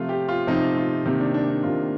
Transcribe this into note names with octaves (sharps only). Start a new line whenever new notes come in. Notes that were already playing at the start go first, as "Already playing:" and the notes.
Already playing: C3 F3 A3 F4
G4
F4
C3 F3 A3 D#4
F4
C3 D#3 A#3
D4
D4
D#4
C3 D#3 A#3 F4